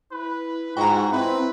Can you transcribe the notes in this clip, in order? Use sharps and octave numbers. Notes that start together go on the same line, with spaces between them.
E4 B4
G#2 F4 F#4 G5 A#5
C4 E4 B4